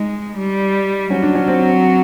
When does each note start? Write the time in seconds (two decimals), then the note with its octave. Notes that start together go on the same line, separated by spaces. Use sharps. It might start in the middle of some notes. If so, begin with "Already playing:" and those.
Already playing: G#3 D#4
0.37 G3
1.10 F#3 C#4
1.23 D4
1.35 C#4
1.47 C4